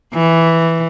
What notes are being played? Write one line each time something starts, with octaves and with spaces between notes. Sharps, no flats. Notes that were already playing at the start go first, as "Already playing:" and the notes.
E3